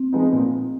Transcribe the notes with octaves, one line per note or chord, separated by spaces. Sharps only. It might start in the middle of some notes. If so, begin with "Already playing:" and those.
Already playing: C4
F3 G#3 B3 D#4
A#2